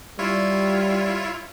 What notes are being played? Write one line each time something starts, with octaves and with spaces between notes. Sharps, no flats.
G3 E4 F4 C#5